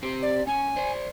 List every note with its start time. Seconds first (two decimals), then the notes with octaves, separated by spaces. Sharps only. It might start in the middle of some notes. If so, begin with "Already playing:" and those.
0.03 C4 G4 C5
0.22 D5
0.47 C#4 G#5
0.76 C5 D5